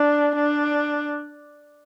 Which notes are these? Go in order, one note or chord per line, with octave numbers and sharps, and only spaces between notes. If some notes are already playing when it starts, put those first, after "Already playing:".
Already playing: D4
D4